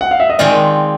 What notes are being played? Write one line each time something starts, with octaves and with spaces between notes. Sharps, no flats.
F#5
F5
E5
D#5
D#3 G#3 C4 F4 D5